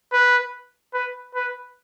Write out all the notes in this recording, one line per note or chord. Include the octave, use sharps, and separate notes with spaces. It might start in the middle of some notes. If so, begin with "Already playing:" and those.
B4
B4
B4